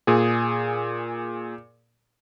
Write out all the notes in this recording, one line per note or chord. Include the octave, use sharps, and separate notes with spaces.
A#2 G#4